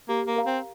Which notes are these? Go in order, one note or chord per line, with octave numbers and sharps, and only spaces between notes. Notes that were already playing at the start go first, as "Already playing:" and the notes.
A#3 G4
A#3
A#4 F5 A#5
C4